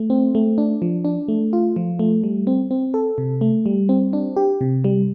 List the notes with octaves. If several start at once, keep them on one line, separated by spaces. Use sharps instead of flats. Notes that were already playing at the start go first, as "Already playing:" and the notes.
Already playing: A3
C4
A3
D4
F3
D4
A3
F4
F3
A3
G3
C4
C4
A4
C3
A3
G3
C4
D4
G4
C3
G3